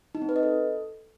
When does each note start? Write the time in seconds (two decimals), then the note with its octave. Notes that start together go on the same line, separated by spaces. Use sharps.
0.15 D#4
0.22 C4
0.29 B4
0.36 D#5
0.43 A4